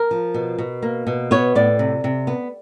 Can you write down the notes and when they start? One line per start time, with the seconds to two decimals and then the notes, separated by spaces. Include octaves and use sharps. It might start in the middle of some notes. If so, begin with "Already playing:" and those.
Already playing: A#4
0.11 F3
0.34 B2
0.58 B2
0.82 A#3
1.07 B2
1.31 B3 C#5
1.55 A2 D5
1.79 C3
2.04 C3
2.27 B3